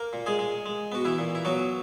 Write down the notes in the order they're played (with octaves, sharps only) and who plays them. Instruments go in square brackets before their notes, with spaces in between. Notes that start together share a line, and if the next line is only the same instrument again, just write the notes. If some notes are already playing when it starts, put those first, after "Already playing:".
Already playing: [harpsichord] A#3 A#4
A#2
G#3 G#4
G#3
G#3
B3 F#4
E3 E4
A#2
E4
F#3 B3 F#4